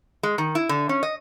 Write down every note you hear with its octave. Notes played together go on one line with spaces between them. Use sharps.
G#3
D#3
E4
D3
C#4
D#5